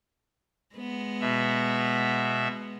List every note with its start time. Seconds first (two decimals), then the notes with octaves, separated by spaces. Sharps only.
0.76 G#3 B3
1.21 B2 E5